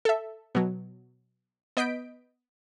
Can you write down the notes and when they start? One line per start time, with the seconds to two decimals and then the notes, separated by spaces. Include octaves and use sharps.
0.05 A4 E5
0.55 B2 F#3
1.77 B3 D#5 G6 B6 D7